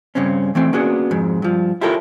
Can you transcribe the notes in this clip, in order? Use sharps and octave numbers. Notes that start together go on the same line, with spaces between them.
G2 C#3 C4 C#4
E3 A3 C4
A#3 B3 C#4 D4 F#4 G#4
F2 G#2
G2 F3
E4 F4 G4 A4 A#4 C#5